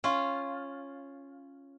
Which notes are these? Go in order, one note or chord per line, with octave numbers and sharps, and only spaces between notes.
C#4 F4